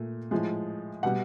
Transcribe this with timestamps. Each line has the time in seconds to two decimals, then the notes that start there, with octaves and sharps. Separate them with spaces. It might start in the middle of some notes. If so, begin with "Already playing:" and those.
Already playing: A#2 A3
0.31 A2 F3 G#3
1.03 B2 G3 F#5